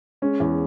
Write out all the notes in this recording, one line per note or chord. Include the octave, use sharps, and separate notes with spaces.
G#3 C#4
E2